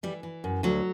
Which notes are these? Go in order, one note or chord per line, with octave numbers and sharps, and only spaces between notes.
E3 G3
E3
F#2
D2 F#3